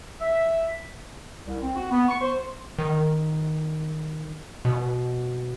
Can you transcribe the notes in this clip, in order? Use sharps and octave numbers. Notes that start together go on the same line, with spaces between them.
E5
C2
C4
F#4
B3
C#6
C5
D#3
B2